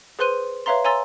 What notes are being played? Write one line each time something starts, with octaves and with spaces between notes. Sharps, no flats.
G#4 B4 C5 C6 F#6 D#7
B4 C#5 E5 F5 A#5 C6
C#5 G#5 A#5 C6 E6 A6